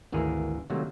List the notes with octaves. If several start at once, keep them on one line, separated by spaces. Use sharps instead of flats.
G#1 D2 E3 A#3 G#4 A#4
C3 D#3 F#3 G3 A3 A#3